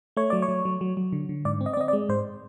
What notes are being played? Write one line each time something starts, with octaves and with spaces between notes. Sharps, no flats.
A3 C#5
F#3 D5
C#5
F#3
F#3
F#3
F#3
D3
D3
G#2 D5
C4
D#5
D5
C4 D#5
D5
G#3
G#2 C5